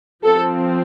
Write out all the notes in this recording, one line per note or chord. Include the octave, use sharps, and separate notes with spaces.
F3 C4 A4